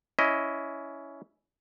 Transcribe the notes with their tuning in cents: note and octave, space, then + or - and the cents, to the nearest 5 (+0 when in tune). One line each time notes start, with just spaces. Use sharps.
C#4 +15 E4 +0 D#5 +10